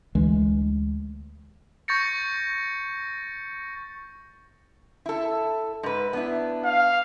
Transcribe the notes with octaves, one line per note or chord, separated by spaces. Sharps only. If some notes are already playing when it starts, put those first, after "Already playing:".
D2 E3 G#3
C#6 G6 A6 A#6 C#7
E4 A4
G#2 B4
B3 D4 E4
F5